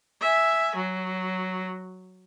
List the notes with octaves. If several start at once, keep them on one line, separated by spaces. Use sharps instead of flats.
E5 G#5
F#3